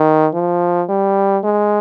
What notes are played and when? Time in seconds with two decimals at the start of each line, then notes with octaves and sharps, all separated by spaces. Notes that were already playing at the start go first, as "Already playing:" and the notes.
Already playing: D#3
0.34 F3
0.89 G3
1.44 G#3